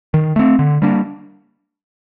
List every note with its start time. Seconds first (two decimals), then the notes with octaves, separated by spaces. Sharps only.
0.14 D#3
0.36 A3 C4
0.59 D3
0.82 G3 A#3 D4